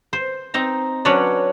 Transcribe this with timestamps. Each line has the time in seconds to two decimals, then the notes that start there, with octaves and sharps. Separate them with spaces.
0.13 C5
0.54 C4 D#4 A#5
1.05 F#3 C#4 D4 B4 C#5 D5